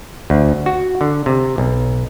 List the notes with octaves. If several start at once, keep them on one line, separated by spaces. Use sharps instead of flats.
D2
F#4
D3
C3
B1